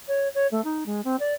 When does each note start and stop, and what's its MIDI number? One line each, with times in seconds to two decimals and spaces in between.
0.08 0.28 73
0.34 0.47 73
0.51 0.63 57
0.64 0.84 63
0.86 1.01 56
1.04 1.16 60
1.19 1.34 74